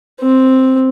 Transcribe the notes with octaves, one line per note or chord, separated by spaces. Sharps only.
C4